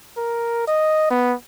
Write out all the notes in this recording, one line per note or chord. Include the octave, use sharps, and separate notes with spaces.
A#4
D#5
B3